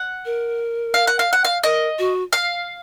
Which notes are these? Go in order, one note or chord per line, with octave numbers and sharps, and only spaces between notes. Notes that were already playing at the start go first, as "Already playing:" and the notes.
Already playing: F#5
A#4
F5
F#5
F5
F#5
F5
A#4 D#5
F#4
F5